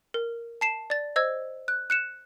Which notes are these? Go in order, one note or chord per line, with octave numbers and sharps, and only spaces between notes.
A#4
A5 C7 E7
D5 A6
C5 D#5 E6 G#6
F#6
F#6 C#7 E7